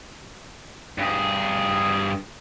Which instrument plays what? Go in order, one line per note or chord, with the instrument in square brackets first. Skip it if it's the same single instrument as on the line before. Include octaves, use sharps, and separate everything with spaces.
[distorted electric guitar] G2 G#4